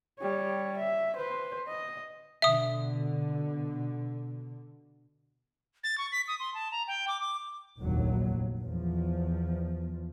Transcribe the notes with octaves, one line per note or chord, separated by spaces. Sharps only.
G3 C#5
E5
B4 C5
D#5
B2 D3 E5 D#6
A6
C#6
B6
D#6
C6
A5
A#5
G5
D6
D6
F1 A#1 D#2 F#3
E2 F3